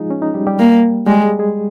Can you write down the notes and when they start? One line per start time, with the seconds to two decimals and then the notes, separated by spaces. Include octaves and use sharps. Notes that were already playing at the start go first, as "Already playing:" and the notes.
Already playing: F3 G#3 D#4 F4 G#4
0.10 C#4
0.22 D#4
0.34 G3 G4
0.47 G3 G4
0.59 A#3
1.06 G3 G#3 G4
1.23 G#3 G#4
1.39 G#3 G#4